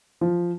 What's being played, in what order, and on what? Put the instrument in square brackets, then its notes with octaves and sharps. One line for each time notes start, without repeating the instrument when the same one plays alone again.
[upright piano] F3